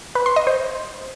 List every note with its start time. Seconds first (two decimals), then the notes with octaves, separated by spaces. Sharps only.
0.15 B4
0.26 C6
0.36 D#5
0.47 C5